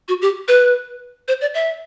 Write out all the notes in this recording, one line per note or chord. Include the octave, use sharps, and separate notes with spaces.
F#4
G4
B4
C5
D5
E5